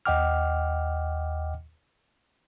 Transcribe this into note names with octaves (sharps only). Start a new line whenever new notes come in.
D#2 D#5 F#5 G5 D6 F6